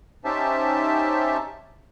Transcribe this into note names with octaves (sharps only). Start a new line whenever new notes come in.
C#4 D#4 G4 C5 E5 A5